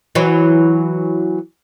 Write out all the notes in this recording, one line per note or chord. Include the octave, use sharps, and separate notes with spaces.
E3 F#3